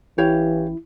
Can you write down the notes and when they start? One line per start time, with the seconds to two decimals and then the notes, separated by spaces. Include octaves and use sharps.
0.18 A1 E3 E4 G4 C#5 F5